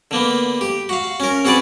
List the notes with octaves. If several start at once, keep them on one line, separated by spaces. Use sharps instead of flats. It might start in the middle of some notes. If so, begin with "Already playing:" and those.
D3 A#3 B3
G4
F#4 F5
C#4 A#4
C4 F#4 G#4 B4 D5